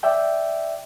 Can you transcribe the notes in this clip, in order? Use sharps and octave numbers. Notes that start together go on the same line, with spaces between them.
D5 E5 G5